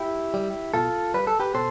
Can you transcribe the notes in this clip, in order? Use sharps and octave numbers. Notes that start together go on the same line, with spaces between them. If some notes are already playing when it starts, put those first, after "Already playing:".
Already playing: E4 G4
G3
B2 F4 A4
G3 B4
A4
G4 B4
B2 A4 C5